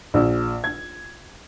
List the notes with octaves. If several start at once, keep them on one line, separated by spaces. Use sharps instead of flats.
A#1
G#6